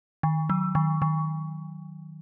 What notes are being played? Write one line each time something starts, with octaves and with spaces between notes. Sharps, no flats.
D#3
F#3
D#3
D#3